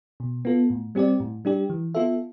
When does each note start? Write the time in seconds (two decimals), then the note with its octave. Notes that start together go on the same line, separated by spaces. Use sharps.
0.20 B2
0.45 B3 F4 A4
0.70 A2
0.95 G3 C4 G4 D5
1.20 A2
1.45 G3 D4 G4
1.70 E3
1.94 B3 F4 A4 E5